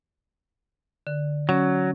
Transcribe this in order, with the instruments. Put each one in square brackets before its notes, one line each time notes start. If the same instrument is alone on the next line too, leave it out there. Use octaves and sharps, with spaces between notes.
[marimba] D3
[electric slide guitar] F#3 [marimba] C#4